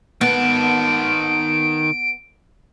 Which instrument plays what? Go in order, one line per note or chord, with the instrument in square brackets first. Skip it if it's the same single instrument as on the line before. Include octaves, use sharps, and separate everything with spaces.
[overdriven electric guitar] D#3 A5 [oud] B3 [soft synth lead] D7